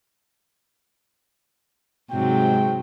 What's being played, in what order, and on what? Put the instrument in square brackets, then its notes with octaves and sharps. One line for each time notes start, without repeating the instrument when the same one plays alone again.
[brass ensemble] G#2 [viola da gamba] C3 F#3 [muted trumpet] G5